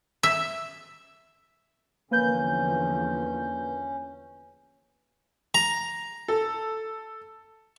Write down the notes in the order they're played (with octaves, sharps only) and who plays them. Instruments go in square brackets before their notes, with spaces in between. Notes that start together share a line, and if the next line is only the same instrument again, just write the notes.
[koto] E5
[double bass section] E2 D3 F3 [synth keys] A#3 B4 G6 [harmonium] C#4
[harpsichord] A#5
[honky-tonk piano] A4